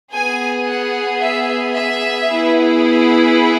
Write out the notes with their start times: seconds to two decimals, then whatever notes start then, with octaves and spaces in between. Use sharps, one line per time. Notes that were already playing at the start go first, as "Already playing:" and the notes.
0.12 B3 G#4 G#5
0.67 F#5
1.20 E5
1.74 E5
2.28 B3 E4 G#4